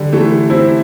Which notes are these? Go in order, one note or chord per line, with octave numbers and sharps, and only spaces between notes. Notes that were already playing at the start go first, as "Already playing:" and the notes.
Already playing: D3 G3
E3 A3
C4 E4